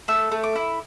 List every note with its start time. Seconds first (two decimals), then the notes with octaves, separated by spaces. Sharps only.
0.08 A3 E6
0.32 A3
0.43 D6
0.56 E4